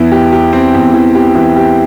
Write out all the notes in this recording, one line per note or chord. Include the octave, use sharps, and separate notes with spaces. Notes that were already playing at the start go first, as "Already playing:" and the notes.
Already playing: E2 E3
G4
G4
C4
E2
E3
G4
E3
G4